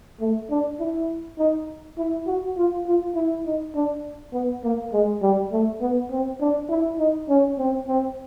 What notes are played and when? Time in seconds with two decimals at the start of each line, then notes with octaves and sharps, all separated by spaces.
0.20 A3
0.50 D4
0.80 E4
1.39 D#4
1.98 E4
2.27 F#4
2.57 F4
2.87 F4
3.15 E4
3.46 D#4
3.75 D4
4.33 B3
4.64 A#3
4.93 G#3
5.22 G3
5.52 A3
5.81 B3
6.11 C4
6.41 D4
6.70 E4
6.99 D#4
7.29 C#4
7.58 C4
7.88 C4